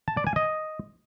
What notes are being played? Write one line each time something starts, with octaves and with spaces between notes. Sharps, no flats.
A5
D5
G#5
D#5